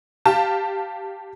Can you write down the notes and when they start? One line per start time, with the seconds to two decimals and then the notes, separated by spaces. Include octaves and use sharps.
0.26 G4 F5 A5